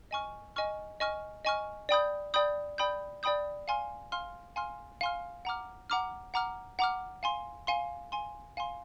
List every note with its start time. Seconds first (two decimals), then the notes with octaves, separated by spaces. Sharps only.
0.11 D#5 G#5 C#6 F6
0.56 D#5 G#5 C#6 F6
1.00 D#5 G#5 C#6 F6
1.45 D#5 G#5 C#6 F6
1.89 D5 G5 B5 D#6 G6
2.34 D5 G5 B5 D#6 G6
2.78 D5 G5 B5 D#6 G6
3.23 D5 G5 B5 D#6 G6
3.68 F5 G#5 C6 F6
4.12 F5 G#5 C6 F6
4.56 F5 G#5 C6 F6
5.01 F5 G#5 C6 F6
5.45 F#5 A#5 D6 F6
5.90 F#5 A#5 D6 F6
6.34 F#5 A#5 D6 F6
6.79 F#5 A#5 D6 F6
7.23 F5 G#5 C6
7.67 F5 G#5 C6
8.12 F5 G#5 C6
8.57 F5 G#5 C6